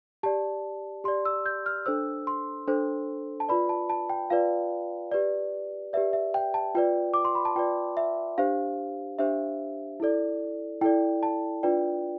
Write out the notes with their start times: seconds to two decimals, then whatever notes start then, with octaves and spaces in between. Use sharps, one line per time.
0.23 G4 D5 A5
1.04 G4 C6
1.08 D5
1.25 E6
1.46 G6
1.66 F6
1.86 D4 A4 C5 E6
2.27 C6
2.67 D4 A4 C5
3.40 A5
3.49 F4 B4 D5 B5
3.69 A5
3.90 A5
4.10 G5
4.30 F4 B4 D5 F5
5.12 G4 B4 D5
5.93 G4 B4 D5 E5
6.13 E5
6.34 G5
6.54 A5
6.75 F4 B4 D5 G5
7.14 D6
7.25 C6
7.35 B5
7.45 A5
7.55 F4 B4 D5 G5
7.97 E5
8.38 D4 G4 C5 F5
9.19 D4 G4 C5 E5
10.00 E4 A4 D5
10.81 E4 A4 D5 G5
11.23 A5
11.63 D4 F4 B4 D5 G5